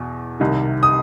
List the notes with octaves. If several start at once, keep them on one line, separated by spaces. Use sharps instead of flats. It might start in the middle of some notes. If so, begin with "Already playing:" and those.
Already playing: E2 B2
C2 C3 D#3
D#6